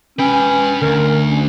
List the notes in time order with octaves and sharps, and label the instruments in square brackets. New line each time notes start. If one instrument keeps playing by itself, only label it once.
[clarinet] C#4 [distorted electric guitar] B4 G5
[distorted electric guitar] D2 [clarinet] A#4
[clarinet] C#4